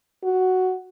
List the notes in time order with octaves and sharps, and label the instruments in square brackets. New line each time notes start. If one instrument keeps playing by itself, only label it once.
[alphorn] F#4